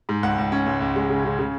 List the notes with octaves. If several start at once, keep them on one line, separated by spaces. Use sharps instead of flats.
G#2
C#2 F#5
C#2
C#4
C#2
C#2
G#3
C#3
C#3
C#3